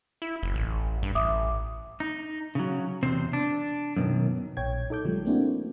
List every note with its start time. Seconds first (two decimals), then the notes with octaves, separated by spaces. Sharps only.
0.22 E4
0.43 F#1
0.55 A1
1.03 G2
1.15 A1 E5 D6 D#6
2.00 D#4
2.55 C#3 F#3
3.03 E2 C3 C4 C5
3.33 D4
3.96 F#2 B2 D#3
4.57 A#1 C#5 G5 G#6
4.90 D#4 A4 D6 G6
5.05 C#3 F3 G3 A3
5.25 A3 A#3 C4 D4 E4 F#4